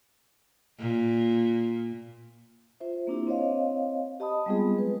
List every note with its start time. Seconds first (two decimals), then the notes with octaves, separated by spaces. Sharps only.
0.79 A#2
2.80 F4 C5 E5
3.07 A#3 C4 D4 E4 G4
3.27 C4 C5 C#5 D#5 F5
4.20 G4 D#5 A5 B5 D#6
4.46 G3 G#3 B3 C4 F4 G#4
4.77 F#3 B4